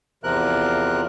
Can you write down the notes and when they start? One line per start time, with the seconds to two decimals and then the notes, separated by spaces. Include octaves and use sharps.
0.24 E2 C3 F3 A#4 F#6